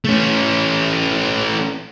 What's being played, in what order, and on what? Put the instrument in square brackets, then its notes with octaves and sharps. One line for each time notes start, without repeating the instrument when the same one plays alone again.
[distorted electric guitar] A3 C#4